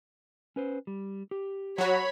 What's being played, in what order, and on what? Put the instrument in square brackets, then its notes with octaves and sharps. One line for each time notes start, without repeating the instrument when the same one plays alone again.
[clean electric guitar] C#4 B4 C5
G3
G4
[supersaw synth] F#3 F#4 [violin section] C#5 B5